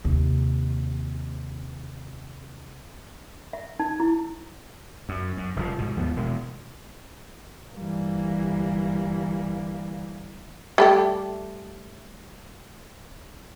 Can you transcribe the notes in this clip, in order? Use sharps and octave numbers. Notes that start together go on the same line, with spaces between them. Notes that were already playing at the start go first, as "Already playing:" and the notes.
D#2 C3
E5
D#4
E4
F#2
F#2
F1 G2 A#2 F3
G#2 B2
D#2 F3 G#3 B3
E1 B2 G#3
G1 E3 G3 A#3
G3 A3 G4